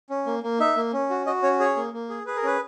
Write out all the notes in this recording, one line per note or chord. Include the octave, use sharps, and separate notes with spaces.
C#4
A#3
A#3
D#4 E5
A#3
C#4
F#4
F#4 D#5
C#4 C#5
G#4 C#5
A#3
A#3
G#4
G#4 B4
A#4
C#4 B4